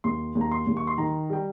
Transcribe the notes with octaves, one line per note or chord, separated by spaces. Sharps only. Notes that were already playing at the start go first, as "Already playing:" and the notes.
D#2 C6
D#2
A#5
C6
D#2
C#6
C6
D#3 A#5
G3 G5